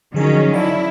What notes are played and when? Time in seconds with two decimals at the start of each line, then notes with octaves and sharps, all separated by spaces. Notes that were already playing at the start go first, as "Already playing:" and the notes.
0.14 D3 D#3 F3 F#3 C#4 G#4
0.54 E4 D5 F5 A5